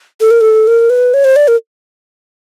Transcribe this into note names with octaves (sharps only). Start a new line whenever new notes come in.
A4
A#4
A4
A#4
B4
C#5
C5
D5
A#4